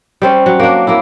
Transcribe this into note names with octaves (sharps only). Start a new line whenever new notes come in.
G3 C4 C#4
F#3
A#3 D4
A#3 E4